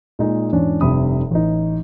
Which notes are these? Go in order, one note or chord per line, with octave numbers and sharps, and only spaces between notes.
A#2 G#3 D#4 G#4
E2 G#2 C#4 D4 C#5
F1 G2 C3 B5 D#6
A1 D#4